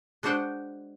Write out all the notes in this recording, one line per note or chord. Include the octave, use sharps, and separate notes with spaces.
G#3 D4 F#4 C5 F#5 G5